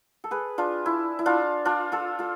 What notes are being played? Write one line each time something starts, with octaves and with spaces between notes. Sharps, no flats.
A4
G#4 B4
D4 F4
E4
E4
D4 F4
D4 F4
F4 A4
F4 A4